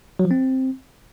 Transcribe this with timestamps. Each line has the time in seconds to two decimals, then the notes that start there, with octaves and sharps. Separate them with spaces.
0.19 F#3
0.25 F3
0.31 C4